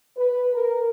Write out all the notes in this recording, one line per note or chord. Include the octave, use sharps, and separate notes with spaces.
B4
A#4